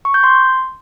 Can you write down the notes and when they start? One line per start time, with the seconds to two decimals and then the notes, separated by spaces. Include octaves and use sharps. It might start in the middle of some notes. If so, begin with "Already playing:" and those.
0.05 C#6
0.14 G6
0.23 C6